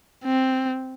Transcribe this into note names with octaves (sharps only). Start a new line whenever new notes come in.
C4